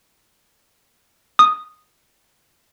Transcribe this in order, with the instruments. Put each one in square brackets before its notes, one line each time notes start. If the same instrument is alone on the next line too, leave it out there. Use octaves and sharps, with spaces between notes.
[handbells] D#6